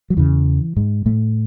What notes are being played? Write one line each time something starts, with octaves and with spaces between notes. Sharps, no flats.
F#3
E2 C#3 E3
G#2 G#3
A2 A3